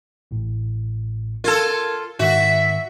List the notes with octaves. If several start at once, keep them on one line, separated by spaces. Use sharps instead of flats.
A1 A2
F4 A4 A#4 G#6
G#2 D#3 F#4 E5